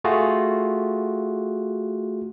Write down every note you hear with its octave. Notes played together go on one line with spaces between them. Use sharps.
A3 F4 F#4 G#4